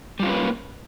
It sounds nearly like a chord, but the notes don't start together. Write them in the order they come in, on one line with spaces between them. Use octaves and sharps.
G3 F4 C#4 B4 A#3